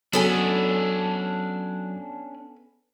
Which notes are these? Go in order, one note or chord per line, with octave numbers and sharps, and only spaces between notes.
F#3 B3 C#4 D4 A4 G#5